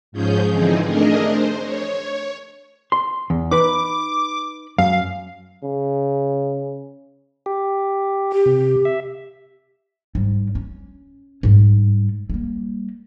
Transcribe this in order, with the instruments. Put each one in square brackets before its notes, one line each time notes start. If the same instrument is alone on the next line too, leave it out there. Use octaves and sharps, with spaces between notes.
[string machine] G#2 F3 C#4 G#4 G6
D3 E3 F3 C4 D#4 G#4
A3 D4 G#4 A#4 D#5
C5
C#5
[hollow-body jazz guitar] C6
E2
[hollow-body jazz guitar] D#4 B4 B5 [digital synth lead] D6
[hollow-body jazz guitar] F#2 [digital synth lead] F5
[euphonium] C#3
[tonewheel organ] G4
[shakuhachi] G4
[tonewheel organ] C3
E5
[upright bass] G#2 G3
C#4
G#2 G3
G3 A#3